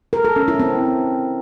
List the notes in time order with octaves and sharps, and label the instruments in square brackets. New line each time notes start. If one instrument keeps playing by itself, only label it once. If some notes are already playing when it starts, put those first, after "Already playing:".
[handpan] A#4
A4
C#4
E4
C4